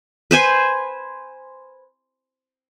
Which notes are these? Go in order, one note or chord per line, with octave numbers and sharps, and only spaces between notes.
B4 C5 G#5